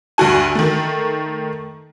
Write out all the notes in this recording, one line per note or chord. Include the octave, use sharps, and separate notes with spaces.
D2 G2 F#4 G#5
D#3 A3